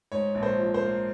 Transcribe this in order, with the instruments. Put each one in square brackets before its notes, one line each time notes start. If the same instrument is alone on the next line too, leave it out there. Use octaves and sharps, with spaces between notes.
[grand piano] G#2 C#5
A#1
C5
F3
C5
A#3